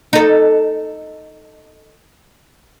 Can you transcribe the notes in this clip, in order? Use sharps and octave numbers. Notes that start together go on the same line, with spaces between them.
D#4 A4